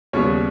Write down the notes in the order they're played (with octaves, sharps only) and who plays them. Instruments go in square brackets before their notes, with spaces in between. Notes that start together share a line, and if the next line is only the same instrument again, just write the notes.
[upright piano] D#2 C#3 G3 B3 C#5